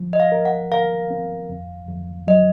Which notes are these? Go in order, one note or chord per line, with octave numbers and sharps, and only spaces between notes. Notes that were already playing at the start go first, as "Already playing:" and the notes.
Already playing: F3
D#5
F5
A#4
F#5
A#4 F5
C4
F2
F2
F#3 D#5